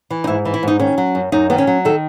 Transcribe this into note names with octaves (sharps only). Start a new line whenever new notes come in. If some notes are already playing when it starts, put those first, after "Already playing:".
E3
D#4
G#2 E4
E3
E4
G#2 D#4
D#3 C#4
F#3
F#2
F#2 D#4
D#3 B3
C#4
F#3
D#3 A4